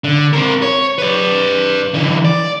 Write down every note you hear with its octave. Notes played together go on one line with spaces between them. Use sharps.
D3
C4 A#4
C#5
B4 D5
D3 E3
D5